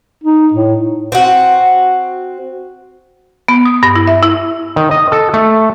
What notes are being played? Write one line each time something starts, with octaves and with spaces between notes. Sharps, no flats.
D#4
A2
C4 F#4
B3
D#6
G2
E4
E5
E4
D#3
D#5
A4
A3